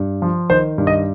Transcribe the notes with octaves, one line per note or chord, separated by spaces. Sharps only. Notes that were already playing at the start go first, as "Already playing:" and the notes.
Already playing: G2
F3
D#3 C5
G2
D#5